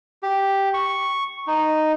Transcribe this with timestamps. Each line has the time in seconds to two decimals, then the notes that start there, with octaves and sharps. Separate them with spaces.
0.23 G4
0.74 C#6
1.47 D#4